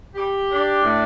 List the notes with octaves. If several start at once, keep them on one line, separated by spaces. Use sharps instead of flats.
G4
D4
A2